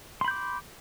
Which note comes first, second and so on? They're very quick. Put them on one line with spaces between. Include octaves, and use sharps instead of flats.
C6 B5 G6 D6